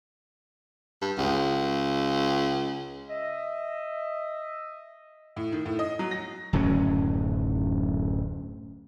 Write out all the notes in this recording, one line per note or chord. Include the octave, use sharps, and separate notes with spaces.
G2
C#2
D#5 E5
A2
D#3
A2
D#5
F#3
A#6
D1 F#2 C#3 C#4